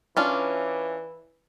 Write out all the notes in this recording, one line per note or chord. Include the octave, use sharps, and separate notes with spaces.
E3 C#4 D4 F4